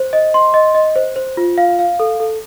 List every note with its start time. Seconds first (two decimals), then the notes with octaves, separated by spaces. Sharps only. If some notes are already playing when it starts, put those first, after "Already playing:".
Already playing: C5
0.13 D#5
0.34 C6
0.54 D#5
0.75 D#5
0.96 C5
1.16 C5
1.37 F4
1.58 F5
1.79 F5
2.00 A4
2.20 A4